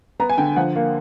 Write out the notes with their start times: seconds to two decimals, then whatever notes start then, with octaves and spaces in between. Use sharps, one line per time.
0.20 B3 A#5
0.30 G#5
0.38 D3 G5
0.56 F3 F#5
0.76 A#3